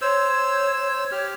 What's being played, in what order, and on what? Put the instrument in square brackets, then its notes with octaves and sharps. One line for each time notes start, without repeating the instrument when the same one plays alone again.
[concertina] C5 E6 [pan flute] C#5
[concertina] G4 F6